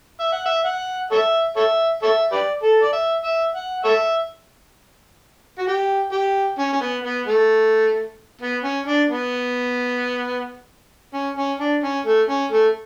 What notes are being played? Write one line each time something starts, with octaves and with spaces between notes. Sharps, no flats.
E5
F#5
E5
F#5
A4 C#5 E5
A4 C#5 E5
A4 C#5 E5
G4 B4 D5
A4
D5
E5
E5
F#5
A4 C#5 E5
F#4
G4
G4
C#4
C#4
B3
B3
A3
B3
C#4
D4
B3
C#4
C#4
D4
C#4
A3
C#4
A3